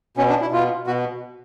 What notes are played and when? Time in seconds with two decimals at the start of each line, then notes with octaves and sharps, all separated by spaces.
0.17 B2 C#4
0.29 D4
0.41 E4
0.52 B2 F4
0.87 B2 F#4